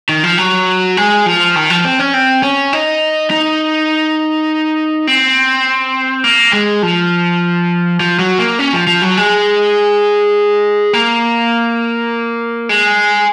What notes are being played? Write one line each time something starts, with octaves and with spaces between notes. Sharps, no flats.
D#3
F3
F#3
G#3
F3
D#3
F3
C4
C#4
C4
C#4
D#4
D#4
C4
A#3
G#3
F3
F3
F#3
A#3
C#4
F3
F3
F#3
G#3
A#3
G#3